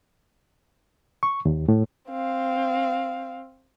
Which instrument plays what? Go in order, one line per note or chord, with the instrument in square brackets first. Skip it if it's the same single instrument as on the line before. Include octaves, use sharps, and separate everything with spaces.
[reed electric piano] C#6
D#2
A2
[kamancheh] C4 F5